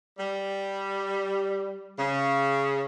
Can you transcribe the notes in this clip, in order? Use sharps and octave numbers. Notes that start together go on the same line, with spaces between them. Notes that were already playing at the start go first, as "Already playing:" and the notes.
G3
C#3